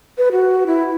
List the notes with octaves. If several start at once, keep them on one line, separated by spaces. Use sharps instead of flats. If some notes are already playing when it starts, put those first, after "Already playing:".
B4
F#4
E4